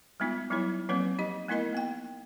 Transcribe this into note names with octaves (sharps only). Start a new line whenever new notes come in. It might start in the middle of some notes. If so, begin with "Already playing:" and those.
G3 G#3 B3 D#4 F4
F#3 G3 B3 D#4 E4 C#5
F3 F#3 A#3 C4 B4 C#5
D#4 G4 D#5
A3 B3 D#4 E4 A#4 D#5
A#3 B3 G5